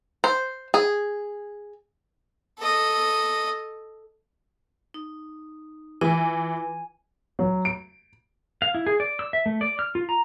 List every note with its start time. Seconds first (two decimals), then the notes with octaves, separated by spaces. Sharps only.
0.24 C5
0.74 G#4
2.59 A4 D#5
4.94 D#4
6.01 E3 E4 F4 B4 G#5
7.39 F#3
7.65 D7
8.62 F5
8.75 E4
8.87 G#4
9.00 D5
9.19 E6
9.33 E5
9.46 A3
9.61 D5
9.79 F6
9.95 F4
10.09 A#5